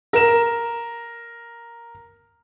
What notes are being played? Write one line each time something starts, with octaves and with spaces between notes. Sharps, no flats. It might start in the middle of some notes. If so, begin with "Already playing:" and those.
A#4 E7